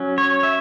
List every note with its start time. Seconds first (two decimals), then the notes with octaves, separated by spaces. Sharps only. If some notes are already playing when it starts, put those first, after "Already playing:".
Already playing: F#3 C#4
0.18 C#5
0.43 E5